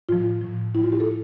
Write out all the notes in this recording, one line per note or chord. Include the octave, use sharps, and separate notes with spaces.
A2 F3 F4
A2 F3
A2 F3 E4
F4
G4
A4